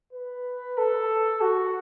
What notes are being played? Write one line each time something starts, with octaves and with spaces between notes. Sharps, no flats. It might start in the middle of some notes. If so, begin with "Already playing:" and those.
B4
A4
F#4